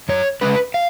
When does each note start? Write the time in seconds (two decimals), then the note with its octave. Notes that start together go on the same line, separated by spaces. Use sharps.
0.09 F#2 C#5
0.41 C#3 G#3 C#4 B4
0.74 F5